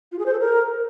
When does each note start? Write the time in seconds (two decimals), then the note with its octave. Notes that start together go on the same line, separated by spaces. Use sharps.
0.12 F4
0.19 G#4
0.26 C5
0.33 A4
0.40 A#4